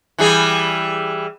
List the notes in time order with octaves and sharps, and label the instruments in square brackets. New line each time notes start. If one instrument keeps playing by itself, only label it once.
[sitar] E3 G3 G#4